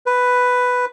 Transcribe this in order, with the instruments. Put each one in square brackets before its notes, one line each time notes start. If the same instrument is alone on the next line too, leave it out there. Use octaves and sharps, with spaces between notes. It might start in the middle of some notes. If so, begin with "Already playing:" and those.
[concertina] B4